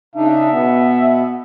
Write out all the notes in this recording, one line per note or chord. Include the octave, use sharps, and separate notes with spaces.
C#3 D4 D#4 E5
B2 B3